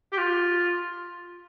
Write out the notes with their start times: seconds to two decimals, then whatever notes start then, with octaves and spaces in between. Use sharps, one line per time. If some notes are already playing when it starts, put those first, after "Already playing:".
0.12 G4
0.18 F4